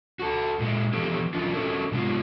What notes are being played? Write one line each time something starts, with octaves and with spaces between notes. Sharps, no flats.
F#4 A4
A#2 G#3
E3 F3 B3 G4 A4
E3 F#3 A3 C#4 F4
C#4 F#4 A4 A#4
C3 G#3 B3 F4